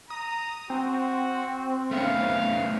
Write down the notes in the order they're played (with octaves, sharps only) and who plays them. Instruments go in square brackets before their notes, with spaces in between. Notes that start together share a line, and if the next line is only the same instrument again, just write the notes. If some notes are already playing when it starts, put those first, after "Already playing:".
[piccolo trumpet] A#5 [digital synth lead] D#6
[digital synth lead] C4 [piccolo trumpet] F#4
[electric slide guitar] A3 B3 C#4 [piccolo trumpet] F5